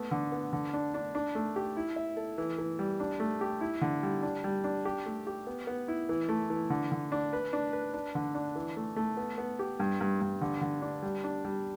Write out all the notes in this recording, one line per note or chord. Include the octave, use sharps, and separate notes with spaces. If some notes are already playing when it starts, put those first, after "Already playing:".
Already playing: A3 B3
D3
B3
D3
D4
D4
D4
A3
G4
E4
E5
A4
E3
E3
G3
D4
A3
G4
E4
D3
G3
D4
G3
D4
G4
A3
G4
B3
B3
E4
E3
A3
E3
D3
D3
D4
B4
D4
B4
D4
D3
D4
E3
A3
A3
B3
B3
G4
G2
G2
G2
D3
D3
D4
G3
D4
G3